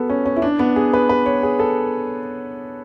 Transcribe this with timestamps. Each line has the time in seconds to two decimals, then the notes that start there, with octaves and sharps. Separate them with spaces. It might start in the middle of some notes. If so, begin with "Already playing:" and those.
Already playing: B3 F#4 G#4 A4 B4
0.10 C#4
0.26 C#4
0.36 E4
0.42 D4
0.59 B3
0.76 G#4
0.94 B4
1.09 B4
1.26 C#5
1.43 G#4
1.59 A4